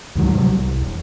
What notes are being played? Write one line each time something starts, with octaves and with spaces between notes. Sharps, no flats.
D2 G#2 D#3 F#3
C3 F#3 G3
C2
E1